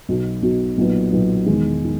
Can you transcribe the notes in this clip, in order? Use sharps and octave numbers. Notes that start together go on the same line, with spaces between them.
B1 B2 F#3
B1 B2 F#3
B1 A#2 F#3 B3
B1 A#2 F#3 B3
E1 E2 D#3 G#3
D#3